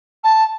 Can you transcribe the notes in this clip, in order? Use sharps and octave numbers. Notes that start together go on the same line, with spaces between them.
A5